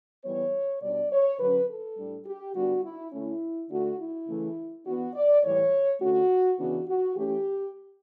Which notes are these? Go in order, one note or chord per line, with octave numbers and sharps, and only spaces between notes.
E3 G3 B3 C#5
B2 G3 D4 D5
C#5
D3 F#3 C#4 B4
A4
A2 G3 D4
G4
D3 G3 B3 D4 F#4
E4
D3 A3 C#4 E4
D3 A3 D4 F#4
E4
C#3 E3 A3
E3 B3 D4 F#4
D5
A2 E3 G3 C#5
D3 A3 C#4 F#4
C#3 E3 B3 D4 F#4
F#4
E3 A3 C#4 G4